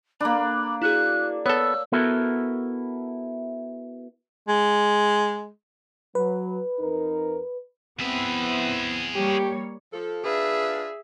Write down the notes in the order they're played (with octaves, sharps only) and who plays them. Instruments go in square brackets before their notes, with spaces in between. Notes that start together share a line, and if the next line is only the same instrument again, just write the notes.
[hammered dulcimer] A#3 D4 [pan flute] B5
[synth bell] E4 F#4 G#4 [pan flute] F#6
[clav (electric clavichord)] B3 A4 [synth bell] C#5 [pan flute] E6
[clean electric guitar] B3 E4 F#4 A4 A#4
[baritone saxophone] G#3
[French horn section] F#3 [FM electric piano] B4
[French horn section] F2 D#4 A#4
[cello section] B3 C4 E4 [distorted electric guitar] G#4 E5
[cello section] G3 A#3 C#5 [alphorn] G4
[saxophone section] F3 A4
[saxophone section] D4 F4 B4 [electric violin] G#4 E5